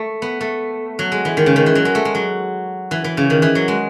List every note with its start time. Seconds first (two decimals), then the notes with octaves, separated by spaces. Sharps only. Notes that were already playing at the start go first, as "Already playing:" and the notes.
Already playing: A3
0.22 B3
0.41 A3
0.99 F#3
1.12 G#3
1.25 E3
1.37 D#3
1.46 C#3
1.56 D#3
1.66 E3
1.75 F#3
1.85 G#3
1.95 A3
2.05 G#3
2.15 F#3
2.91 E3
3.04 E3
3.17 C#3
3.30 D#3
3.42 E3
3.55 F#3
3.68 G#3